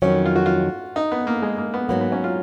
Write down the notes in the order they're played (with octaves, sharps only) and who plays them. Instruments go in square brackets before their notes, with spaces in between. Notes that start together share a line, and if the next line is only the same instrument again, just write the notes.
[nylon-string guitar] F2 D#3 F#3 [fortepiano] C#4
[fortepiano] F4
F#4
F4
D#4
B3
A#3
G#3
A#3
B3
[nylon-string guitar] G#2 F#3 A#3 [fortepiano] B3
[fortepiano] B3
C#4
F4